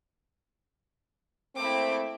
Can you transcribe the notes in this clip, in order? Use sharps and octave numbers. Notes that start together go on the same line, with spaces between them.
A3 A#3 C4 E4 D6